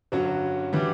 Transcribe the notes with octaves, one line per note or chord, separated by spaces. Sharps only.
G2 D3 F#3 C#4 F#4
E3 G3 D4 F#4